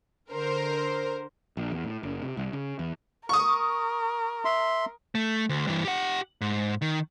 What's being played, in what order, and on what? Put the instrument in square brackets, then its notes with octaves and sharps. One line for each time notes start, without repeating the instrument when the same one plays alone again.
[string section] D3 A#4 C5
[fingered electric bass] A#1
E2
A2
F#1
C3
C2
C#3
E2
[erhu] A#4 [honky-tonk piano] C#6 D#6
[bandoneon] E5 C6
[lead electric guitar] A3
D2
G2 E3
G4 F#5
G#2
D#3